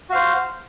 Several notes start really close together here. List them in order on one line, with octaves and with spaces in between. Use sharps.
F#4 F5 C5